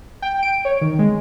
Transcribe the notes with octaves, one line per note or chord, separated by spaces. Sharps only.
G5
D7
C#5
D#3
G#3